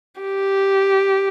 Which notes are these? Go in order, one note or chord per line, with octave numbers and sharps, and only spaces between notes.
G4